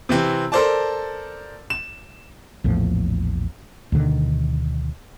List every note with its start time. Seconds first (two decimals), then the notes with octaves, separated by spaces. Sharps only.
0.09 C3 E3 C4
0.52 A4 A#4 C5 D5 A5
1.70 E7
2.64 A#1 E2 A2 F3
3.92 D2 B2 D3 D#3